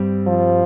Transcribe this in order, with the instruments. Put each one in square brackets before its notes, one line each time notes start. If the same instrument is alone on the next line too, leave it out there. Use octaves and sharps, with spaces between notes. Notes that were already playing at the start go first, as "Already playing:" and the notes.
Already playing: [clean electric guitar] G2 G3 C4
[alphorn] F3